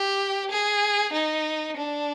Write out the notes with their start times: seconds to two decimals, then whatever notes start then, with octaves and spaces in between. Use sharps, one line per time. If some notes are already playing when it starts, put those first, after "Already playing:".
Already playing: G4
0.51 G#4
1.13 D#4
1.77 D4